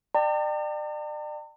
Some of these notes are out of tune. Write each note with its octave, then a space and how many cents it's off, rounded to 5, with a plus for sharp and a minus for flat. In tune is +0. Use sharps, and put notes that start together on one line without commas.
D5 +35 G5 +0 A#5 -45